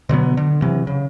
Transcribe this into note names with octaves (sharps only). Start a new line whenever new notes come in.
B2 D3 F#3 B3
D3
C3 E3 F#3
C#3